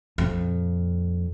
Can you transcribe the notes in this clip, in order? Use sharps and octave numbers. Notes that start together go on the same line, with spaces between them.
F2 A#2